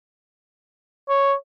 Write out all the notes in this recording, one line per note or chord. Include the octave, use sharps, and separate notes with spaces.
C#5